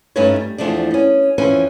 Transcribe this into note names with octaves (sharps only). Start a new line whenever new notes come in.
G2 A3 C#4 D#4 B4 C#5
G3
E2 F3 A3 D4 D5
B3 C#4
F2 E3 C#4 B4 C5 G#5